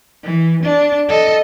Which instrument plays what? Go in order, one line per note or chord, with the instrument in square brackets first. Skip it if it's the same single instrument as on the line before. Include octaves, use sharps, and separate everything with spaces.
[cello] E3
D4
A4 D#5